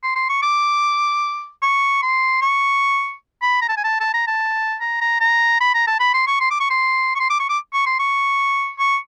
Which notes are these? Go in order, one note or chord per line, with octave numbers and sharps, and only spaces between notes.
C6
C6
C#6
D6
C#6
C6
C#6
B5
A#5
A5
G#5
A5
A5
A#5
A5
A#5
A#5
A#5
B5
A#5
A5
B5
C6
C#6
C6
D6
C#6
C6
C#6
C6
D6
C#6
D6
C#6
C6
C#6
C#6